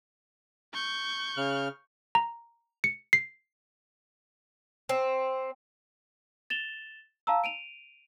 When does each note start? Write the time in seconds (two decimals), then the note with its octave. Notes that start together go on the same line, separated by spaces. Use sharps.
0.73 C#6 G6
1.37 C#3 F6
2.15 A#5
2.84 C#7
3.13 C7
4.89 C4
6.50 A6 E7 F7 G7
7.27 F5 A5 A#5 E6
7.44 D7 D#7 F7